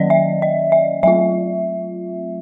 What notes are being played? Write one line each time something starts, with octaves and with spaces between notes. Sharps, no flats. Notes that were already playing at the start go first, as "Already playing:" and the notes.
Already playing: D#3 F#3 A#3 C#4 D5 D#5
E5
D#5
E5
F#3 A3 C4 F4 E5